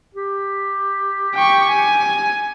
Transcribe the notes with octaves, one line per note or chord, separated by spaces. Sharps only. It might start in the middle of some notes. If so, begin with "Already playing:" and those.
G4
G5 C#6
G#5